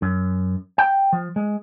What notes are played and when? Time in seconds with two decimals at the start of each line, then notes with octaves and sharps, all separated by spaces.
0.02 F#2
0.78 G5
1.13 F3
1.36 G#3